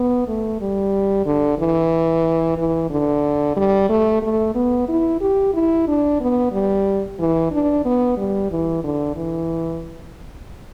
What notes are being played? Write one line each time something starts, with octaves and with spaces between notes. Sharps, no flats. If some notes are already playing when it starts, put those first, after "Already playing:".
Already playing: B3
A3
G3
D3
E3
E3
D3
G3
A3
A3
B3
E4
G4
E4
D4
B3
G3
E3
D4
B3
G3
E3
D3
E3